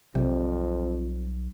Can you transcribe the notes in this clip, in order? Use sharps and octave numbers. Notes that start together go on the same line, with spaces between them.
B1 F2 C3 G3 C4